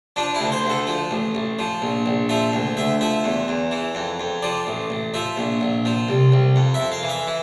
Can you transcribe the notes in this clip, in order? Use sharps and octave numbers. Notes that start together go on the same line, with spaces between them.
F3 D4
E4
D2
C5
D2
A4
F3
A1
A1
F3
A#1
A#1
F3 E5
D2
D2 E5
F3 E5
E2
E2
E3
F2
F2
F3 D5
A1
A1
F3 E5
A#1
A#1
F3
C2
C2
F2
E5
F2
F5
E3
E5
E3